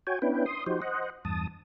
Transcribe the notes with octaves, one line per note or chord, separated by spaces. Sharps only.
F#4 C#5 G5 G#5
B3 C#4 D4 E4 B4 G5
C6 D#6
F3 D#4 F#4 G4 C5
C5 D#5 F#5
E2 G2 A5 D#6